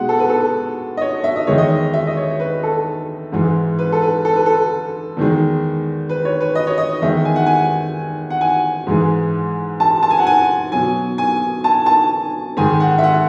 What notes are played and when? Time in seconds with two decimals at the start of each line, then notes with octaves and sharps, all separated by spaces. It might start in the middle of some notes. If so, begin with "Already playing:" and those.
Already playing: B2 G#3 F#5
0.09 A4
0.19 B4
0.29 A4
0.97 D#5
1.01 C#5
1.24 E5
1.36 D#5
1.47 E2 D#3 G#3 C#5
1.58 D#5
1.94 E5
2.07 D#5
2.17 C#5
2.40 B4
2.63 A4
3.32 G#2 E3 G#3
3.79 B4
3.92 A4
4.02 B4
4.25 A4
4.36 B4
4.46 A4
5.17 E2 D#3 G#3
6.09 B4
6.25 C#5
6.41 B4
6.55 D#5
6.67 C#5
6.78 D#5
7.02 E2 D#3 G#3 E5
7.25 G#5
7.36 F#5
7.46 G#5
8.30 F#5
8.41 G#5
8.87 G#2 E3 G#3
9.80 A5
10.03 A5
10.10 G#5
10.19 F#5
10.27 G#5
10.72 B2 F#3 G#5
11.18 G#5
11.64 A5
11.86 A5
12.57 G#2 D#3 G#3 G#5
12.80 F#5
12.98 E5
13.04 F#5